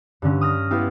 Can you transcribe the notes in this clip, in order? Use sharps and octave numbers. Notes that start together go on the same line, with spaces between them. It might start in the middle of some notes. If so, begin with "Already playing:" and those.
G2 D3 C#4
D#6 F6 A#6
B3 E4 F4 G4